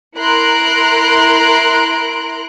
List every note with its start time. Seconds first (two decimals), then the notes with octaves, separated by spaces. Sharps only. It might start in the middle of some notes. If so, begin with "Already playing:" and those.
0.18 E4 A#4 A#5 C6 F#6 D7